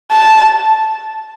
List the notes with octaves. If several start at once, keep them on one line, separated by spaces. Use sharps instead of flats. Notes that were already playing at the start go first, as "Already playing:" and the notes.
A5